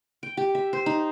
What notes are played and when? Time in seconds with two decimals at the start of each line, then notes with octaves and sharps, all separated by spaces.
0.23 G5
0.37 G4
0.55 E5
0.73 C5
0.86 D#4